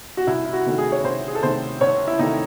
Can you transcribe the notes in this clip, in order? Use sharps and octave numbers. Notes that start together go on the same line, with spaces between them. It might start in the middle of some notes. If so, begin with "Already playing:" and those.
F#4
C2 E4
E4
F#4
C3 D#3 A3
G#4
C#5
C2 C5
G#4
A4
C3 D#3 A3 C5
C2 C#5
E4
C3 D#3 A3 D#4